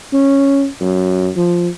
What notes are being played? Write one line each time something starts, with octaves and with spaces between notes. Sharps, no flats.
C#4
F#2
F3